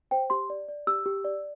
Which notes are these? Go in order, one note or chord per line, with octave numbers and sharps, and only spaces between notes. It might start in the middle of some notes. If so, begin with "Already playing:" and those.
C5 G5
G4 C6
D5
D5
G4 E6
G4
D5